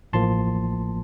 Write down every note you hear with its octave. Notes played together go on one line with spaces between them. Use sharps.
A1 A2 F3 A#3 A5 C6